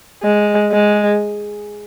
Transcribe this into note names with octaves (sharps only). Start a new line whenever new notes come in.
G#3
G#3